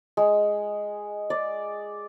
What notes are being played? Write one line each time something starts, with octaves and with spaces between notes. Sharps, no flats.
G#3
D5